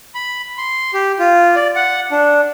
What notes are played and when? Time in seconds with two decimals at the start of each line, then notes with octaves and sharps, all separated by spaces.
0.15 B5
0.58 C6
0.94 G4
1.19 F4
1.56 D5
1.76 F#5
2.11 D4